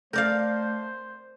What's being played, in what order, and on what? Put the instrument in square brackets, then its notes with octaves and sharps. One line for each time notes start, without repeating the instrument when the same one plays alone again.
[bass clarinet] A3 [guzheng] A#4 D5 F5 [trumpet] C5 [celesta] G6